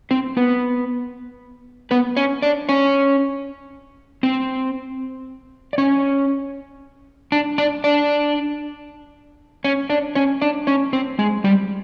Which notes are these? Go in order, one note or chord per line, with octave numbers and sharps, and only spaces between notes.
C4 C5
B3 B4
B3 B4
C#4 C#5
D4 D5
C#4 C#5
C4 C5
D5
C#4 C#5
D4 D5
D4 D5
D4 D5
C#4 C#5
D4 D5
C#4 C#5
D4 D5
C#4 C#5
C4 C5
G#3 G#4
G3 G4